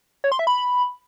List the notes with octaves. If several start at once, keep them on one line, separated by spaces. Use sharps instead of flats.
C#5
C6
E5
B5